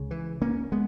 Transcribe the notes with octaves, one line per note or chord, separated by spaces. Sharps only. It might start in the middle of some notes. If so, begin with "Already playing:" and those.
Already playing: C#2 C#3
E3
A#3 C#4
G#3 B3